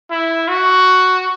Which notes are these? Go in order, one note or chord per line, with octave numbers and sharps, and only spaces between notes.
E4
F#4